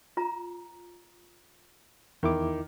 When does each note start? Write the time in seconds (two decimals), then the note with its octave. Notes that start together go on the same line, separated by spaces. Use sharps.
0.17 F4 A#5
2.23 E2 D#3 E4 D6